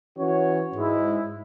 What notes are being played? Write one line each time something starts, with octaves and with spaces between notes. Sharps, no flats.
E3 C#4 F#4 C#5
G#2 G#3 E4